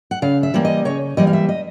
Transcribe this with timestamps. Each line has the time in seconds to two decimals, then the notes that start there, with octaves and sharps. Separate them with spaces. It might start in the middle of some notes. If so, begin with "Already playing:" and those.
0.11 F#5
0.22 C#3 F5
0.43 E5
0.54 E3 G3 A#3
0.65 D#5
0.85 C#3 C#5
1.17 E3 G3 A#3 D#5
1.27 F5
1.33 E5
1.49 D#5